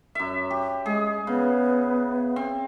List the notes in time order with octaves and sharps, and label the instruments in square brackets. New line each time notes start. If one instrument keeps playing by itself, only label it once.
[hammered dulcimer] F#2 E5
G4
[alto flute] G#3 [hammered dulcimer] G#4
[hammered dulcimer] C#3 [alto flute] B3
[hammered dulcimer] C4